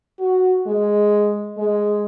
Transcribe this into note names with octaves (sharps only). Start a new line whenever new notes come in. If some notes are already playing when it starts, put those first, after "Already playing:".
F#4
G#3
G#3